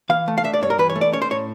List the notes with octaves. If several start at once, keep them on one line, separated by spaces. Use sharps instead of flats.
E3 F5
A3
F5
D4 E5
D5
G2 C#5
A#4
E3 B4
C#5
A3
D5
C#4 C#5
C5
A2 C#5